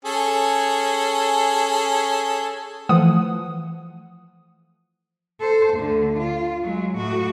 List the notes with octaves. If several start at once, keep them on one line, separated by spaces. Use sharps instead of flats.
C#4 G#4 A4
E3 F3 A3 F#5 D#6
A4 C5
D2 D3
F4
F#3 G#3
A2 F#4